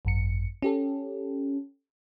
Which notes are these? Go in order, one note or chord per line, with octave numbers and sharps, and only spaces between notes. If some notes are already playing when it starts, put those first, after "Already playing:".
G#1 F#2 C#7
C#4 G4 A4